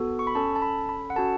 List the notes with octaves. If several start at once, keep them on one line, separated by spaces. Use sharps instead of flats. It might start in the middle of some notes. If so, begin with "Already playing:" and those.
Already playing: B3 F#4 A4
C#6
B5
C#4 A4 A5
A5
B5
B5
F#5
C#4 F#4 A4 A5